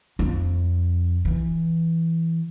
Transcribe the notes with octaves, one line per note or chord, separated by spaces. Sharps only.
F2
E3